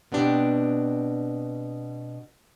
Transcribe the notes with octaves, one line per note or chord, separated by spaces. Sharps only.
B2 B3 C4 D4 G4